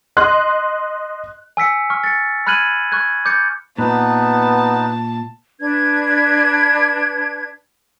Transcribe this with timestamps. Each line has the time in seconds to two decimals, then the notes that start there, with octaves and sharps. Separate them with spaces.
0.17 D#5 C6 F#6
1.57 G#5 E6 B6 C#7
1.90 C#6 F6
2.04 A6 C#7
2.47 B5 F6 F#6 G#6 D#7 F#7
2.92 C#6 F#6 G#6
3.25 D6 G6 A6 C#7
3.78 A#2 B3 D#4 B4 A5
5.60 D4 B4 G#6